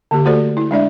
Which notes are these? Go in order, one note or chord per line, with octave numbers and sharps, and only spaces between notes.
D3 A#3 G4
A3 F#4 A4 C5 D5
E4
G#3 D4 D5 E5